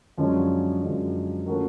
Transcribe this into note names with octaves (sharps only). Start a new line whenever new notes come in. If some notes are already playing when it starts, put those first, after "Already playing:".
F#2 D3 F3 G#3 C#4
F#2 D3 F3 G#3 C#4
F3 A3 C#4 F#4 A#4